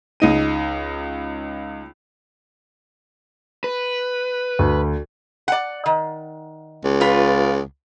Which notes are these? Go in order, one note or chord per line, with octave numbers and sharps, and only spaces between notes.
C#2 D#4 D#7
B4
D2
D5 F#5
D#3
C#2
F4 B4